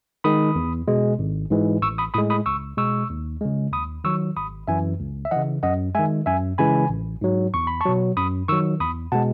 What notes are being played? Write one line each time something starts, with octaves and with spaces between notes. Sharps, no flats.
D#3 G#3 B5 D#6
E2
B2 G#3
G#1
G#2 E3 G#3
A1 C#6 E6
B5 D#6
A2 G#3 B5 D#6
B5 D#6
C#2 C#6 E6
B2 G#3 C#6 E6
D#2
C#3 G#3
D#2 B5 D#6
D#3 F#3 C#6 E6
G#1 B5 D#6
F#2 E3 E5 G#5
C#2
E5
C#3 E3 D#5 F#5
F#2 D#5 F#5
D#3 G#3 E5 G#5
F#2 E5 G#5
C#3 E3 G#3 G#5 B5
A1
G#2 F#3
E2 C#6
B5
A5 C#6
B2 F#3
F#2 B5 D#6
D#3 F#3 C#6 E6
E2 B5 D#6
B2 G#3 F#5 A5